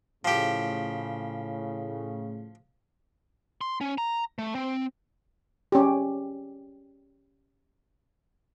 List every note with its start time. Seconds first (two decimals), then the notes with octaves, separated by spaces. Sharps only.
0.25 A2 C#3 F3 G4
3.61 C6
3.81 C#4
3.98 A#5
4.39 A3
4.55 C4
5.72 C#4 G4